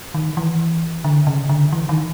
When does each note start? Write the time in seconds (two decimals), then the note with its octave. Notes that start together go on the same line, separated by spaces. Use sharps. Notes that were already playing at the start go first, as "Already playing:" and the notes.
0.14 D#3
0.37 E3
1.04 D3
1.27 C#3
1.49 D3
1.72 E3
1.89 D#3